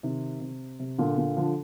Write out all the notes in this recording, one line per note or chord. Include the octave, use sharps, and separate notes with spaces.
C3 D#3
C3
C3
A#2 D3
A#2 D3
D3 F3